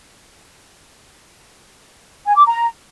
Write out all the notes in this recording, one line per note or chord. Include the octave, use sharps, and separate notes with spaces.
G#5
D6
A#5